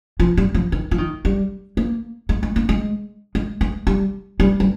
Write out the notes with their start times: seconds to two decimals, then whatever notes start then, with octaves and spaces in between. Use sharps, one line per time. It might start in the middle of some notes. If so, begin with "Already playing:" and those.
0.20 F3
0.37 G3
0.54 F3
0.72 D#3
0.91 F3
0.98 D#3
1.25 G3
1.77 A#3
2.29 G#3
2.43 G#3
2.56 A#3
2.69 G#3
3.35 G#3
3.61 G#3
3.87 G3
4.40 G3
4.60 G3